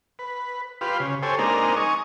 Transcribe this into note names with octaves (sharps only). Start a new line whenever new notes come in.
B4
F4 G4 B4 C6
C#3
G4 A4 C5 C#5 G#5
G#3 A#3 C4 D4 D#4 A#4
D#4 G#5 C#6